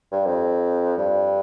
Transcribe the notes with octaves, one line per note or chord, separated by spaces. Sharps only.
G2
F2
G2